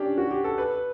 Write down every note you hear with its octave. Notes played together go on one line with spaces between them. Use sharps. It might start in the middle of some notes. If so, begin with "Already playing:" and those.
Already playing: C#4 D4 G4
F#4
G4
A4
B4